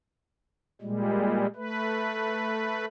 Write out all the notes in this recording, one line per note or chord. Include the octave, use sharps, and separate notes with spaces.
A#2 G3 G#3
A3 B4